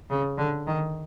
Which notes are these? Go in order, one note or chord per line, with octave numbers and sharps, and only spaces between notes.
C#3
D3
D#3